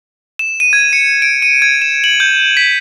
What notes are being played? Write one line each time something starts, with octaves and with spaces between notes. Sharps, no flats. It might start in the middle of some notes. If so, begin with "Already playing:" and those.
E7
D#7
G#6
C#7
D7
D#7
G#6
E7
F#7
G6
B6